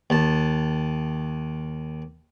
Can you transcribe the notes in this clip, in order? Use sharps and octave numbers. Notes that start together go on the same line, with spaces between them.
D#2 A5